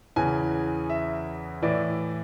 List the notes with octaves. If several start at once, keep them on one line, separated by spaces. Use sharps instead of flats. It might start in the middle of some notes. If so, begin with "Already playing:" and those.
E2 C#3 E3 G#5
E5
A2 E3 D5